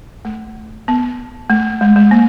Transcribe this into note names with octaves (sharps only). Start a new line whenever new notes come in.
A3
B3
A3
G#3
G#3
A#3